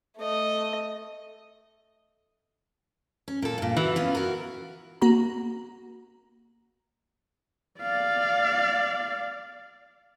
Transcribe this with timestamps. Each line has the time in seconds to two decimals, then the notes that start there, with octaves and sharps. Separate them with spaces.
0.17 A3 D#5
3.28 C#4
3.42 A#2 A4
3.58 G2 A#2
3.77 E3 F#4 C#5
3.96 B3 C#4 F4
4.15 F#4 A#4
5.02 A#3 F#4 A#5
7.80 D5 F5